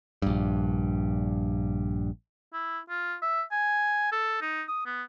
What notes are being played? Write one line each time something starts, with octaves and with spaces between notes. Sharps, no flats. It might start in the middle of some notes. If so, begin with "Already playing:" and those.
A#1 G2
E4
F4
E5
G#5
A4
D#4
D#6
B3